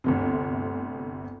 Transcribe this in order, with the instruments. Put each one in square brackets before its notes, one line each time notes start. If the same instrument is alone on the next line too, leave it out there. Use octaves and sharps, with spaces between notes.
[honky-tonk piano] G1 D2 C3